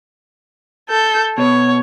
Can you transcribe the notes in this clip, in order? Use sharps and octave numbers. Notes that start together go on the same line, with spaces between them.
A4 G6
B2 C#5